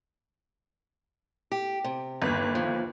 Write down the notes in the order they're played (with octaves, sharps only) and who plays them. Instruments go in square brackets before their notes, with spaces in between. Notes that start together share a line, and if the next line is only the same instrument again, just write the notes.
[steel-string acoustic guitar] G4
C3
[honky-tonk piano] G1 D#2 [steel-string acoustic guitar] B4
[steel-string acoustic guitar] F3